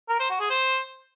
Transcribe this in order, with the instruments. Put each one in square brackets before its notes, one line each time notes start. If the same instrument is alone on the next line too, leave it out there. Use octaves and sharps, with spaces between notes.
[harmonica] A#4
C5
F#4
G#4
C5